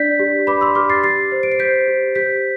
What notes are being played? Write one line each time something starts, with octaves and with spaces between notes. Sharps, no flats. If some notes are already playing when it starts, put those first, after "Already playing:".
Already playing: D4 D5 G6 B6
G4
B4 B5 D6
C6 E6
G4 D6 F6
A6 C7
G4 A6 C7
C5
D7
C7
C5 G6 B6
G4
G4 G6 B6